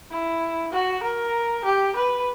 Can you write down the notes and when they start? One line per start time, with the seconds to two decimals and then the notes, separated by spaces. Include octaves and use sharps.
0.11 E4
0.72 F#4
1.03 A#4
1.64 G4
1.96 B4